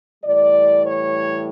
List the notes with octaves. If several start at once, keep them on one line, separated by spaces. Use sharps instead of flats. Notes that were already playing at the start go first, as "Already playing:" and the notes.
A2 E3 G3 D5
C#5